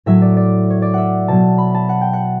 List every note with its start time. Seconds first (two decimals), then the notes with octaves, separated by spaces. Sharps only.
0.06 A2 F#3 E5
0.22 D5
0.37 D5
0.70 C#5
0.82 D5
0.94 E5 F#5
1.28 B2 F#3 A5
1.58 B5
1.74 A5
1.89 F#5
2.01 G5
2.13 F#5